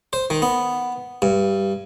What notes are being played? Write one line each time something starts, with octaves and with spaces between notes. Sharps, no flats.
C5
D#3
B3
G2